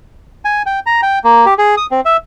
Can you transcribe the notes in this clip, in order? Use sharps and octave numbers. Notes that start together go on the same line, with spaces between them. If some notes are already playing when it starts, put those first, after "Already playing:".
G#5
G5
A#5
G5
A#3
G4
G#4
D#6
C4
E5